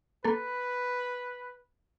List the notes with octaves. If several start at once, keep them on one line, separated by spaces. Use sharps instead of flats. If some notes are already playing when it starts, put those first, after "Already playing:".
A#3 A4 B4